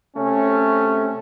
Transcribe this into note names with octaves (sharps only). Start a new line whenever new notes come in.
C3 A3 C#4